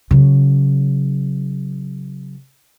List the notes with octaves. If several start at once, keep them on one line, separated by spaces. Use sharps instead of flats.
C#3 F#3